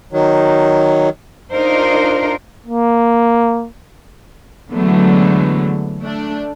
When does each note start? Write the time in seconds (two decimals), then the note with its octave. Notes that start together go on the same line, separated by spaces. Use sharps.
0.13 D#3 F#3
1.53 D4 D#4 F4 A#4 C5
2.67 A#3
4.72 D3 E3 F#3 G#3 A3 B3
6.01 A3 D4